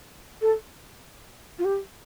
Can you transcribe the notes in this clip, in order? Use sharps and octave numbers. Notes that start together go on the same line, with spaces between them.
A4
F4
G4